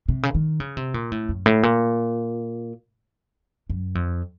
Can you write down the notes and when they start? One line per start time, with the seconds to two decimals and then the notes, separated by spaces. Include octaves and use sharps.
0.09 C3
0.23 C#3
0.35 D#3
0.60 C#3
0.77 C3
0.94 A#2
1.12 A2
1.29 F#2
1.46 A2
1.63 A#2
3.70 F#2
3.95 F2